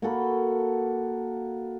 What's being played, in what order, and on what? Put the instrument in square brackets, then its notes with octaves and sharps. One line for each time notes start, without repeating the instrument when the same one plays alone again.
[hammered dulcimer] A#3 F#4 A4 B5